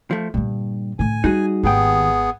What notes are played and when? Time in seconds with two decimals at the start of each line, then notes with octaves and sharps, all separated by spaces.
0.11 F3 A3
0.34 G2 A#2 D3
0.99 A2 D3 G#5
1.24 G3 D#4 F#4 G#4
1.63 G#1 D#2 B3 G#4 G5